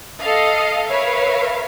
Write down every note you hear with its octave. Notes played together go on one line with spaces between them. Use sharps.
A4 D#5 F5
A#4 B4 C#5 E5 F5